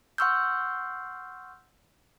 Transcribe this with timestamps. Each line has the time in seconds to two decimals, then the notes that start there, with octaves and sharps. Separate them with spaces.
0.18 F#5 C6 C#6 E6 F6 G6